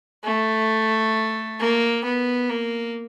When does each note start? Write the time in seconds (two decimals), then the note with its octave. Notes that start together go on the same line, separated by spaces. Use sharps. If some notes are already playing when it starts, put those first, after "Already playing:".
0.24 A3
1.60 A#3
2.04 B3
2.49 A#3